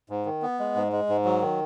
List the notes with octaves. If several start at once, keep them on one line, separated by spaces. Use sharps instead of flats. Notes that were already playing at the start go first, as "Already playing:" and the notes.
G#2
D#3
B3
G#3
G#2
G#3
G#2
F#3
D#3